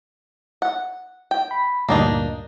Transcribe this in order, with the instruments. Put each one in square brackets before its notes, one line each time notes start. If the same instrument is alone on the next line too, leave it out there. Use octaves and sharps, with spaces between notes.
[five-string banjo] F#5
G5
[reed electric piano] B5
[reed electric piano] D2 G2 A#2 [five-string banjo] A#3 D4 D#4